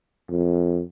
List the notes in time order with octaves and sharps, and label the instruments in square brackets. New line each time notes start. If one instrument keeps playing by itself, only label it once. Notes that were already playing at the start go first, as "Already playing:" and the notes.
[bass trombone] F2